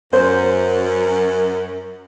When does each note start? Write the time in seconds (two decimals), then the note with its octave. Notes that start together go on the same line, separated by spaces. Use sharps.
0.13 F#2 A#4 C5